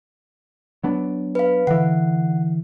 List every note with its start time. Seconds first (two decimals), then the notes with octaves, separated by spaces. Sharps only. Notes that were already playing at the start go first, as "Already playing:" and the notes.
0.83 F#3 B3 D4
1.35 B4 F5
1.67 D3 E3 F#5